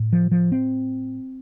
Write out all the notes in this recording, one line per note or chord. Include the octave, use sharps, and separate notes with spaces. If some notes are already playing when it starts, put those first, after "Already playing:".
Already playing: A2
F3
F3
C4